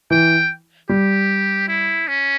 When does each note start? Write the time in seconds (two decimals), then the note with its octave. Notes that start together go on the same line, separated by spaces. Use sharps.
0.11 E3 G5
0.89 G3 G4
1.68 E4
2.08 C#4